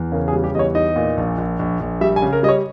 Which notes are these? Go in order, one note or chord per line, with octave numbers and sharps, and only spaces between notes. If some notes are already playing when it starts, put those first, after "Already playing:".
Already playing: E2
C#3 A#4
G#4
G3
G4
E2 C#5 D#5
D#4 D#5
A#2
A#1
A#1
A#1
A#1
G3 E5
G#5
C#3
A#4
G3 D#5
C#5